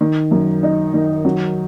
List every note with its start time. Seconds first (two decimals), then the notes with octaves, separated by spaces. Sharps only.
0.01 D#3
0.31 F#2
0.63 D#4
0.94 D#3
1.25 F#3